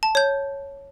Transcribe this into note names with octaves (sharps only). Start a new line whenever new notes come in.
A5
C#5 G6